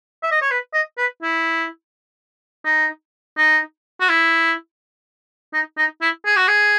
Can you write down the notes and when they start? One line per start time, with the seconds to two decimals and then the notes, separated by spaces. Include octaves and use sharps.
0.23 E5
0.31 D#5
0.41 C#5
0.51 B4
0.74 D#5
0.98 B4
1.22 E4
2.65 D#4
3.37 D#4
4.00 F#4
4.09 E4
5.53 D#4
5.78 D#4
6.02 E4
6.26 G#4
6.36 F#4
6.48 G#4